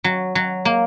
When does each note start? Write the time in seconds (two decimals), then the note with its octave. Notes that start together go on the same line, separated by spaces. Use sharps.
0.04 F#3
0.35 F#3
0.65 A#3